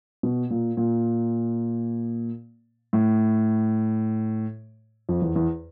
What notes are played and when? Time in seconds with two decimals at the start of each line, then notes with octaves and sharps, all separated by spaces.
0.23 B2
0.51 A#2
0.77 A#2
2.93 A2
5.09 F2
5.22 E2
5.36 E2